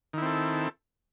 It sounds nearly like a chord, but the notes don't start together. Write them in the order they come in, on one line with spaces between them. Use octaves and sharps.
D#3 E4 C4 A4